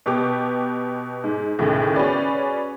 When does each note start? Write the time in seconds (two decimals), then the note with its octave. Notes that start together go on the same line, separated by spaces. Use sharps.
0.06 B2 B3 G4 D6
1.24 G#2
1.59 D#2 A2 C#3
1.96 C#4 F#4 G#4 B4 D5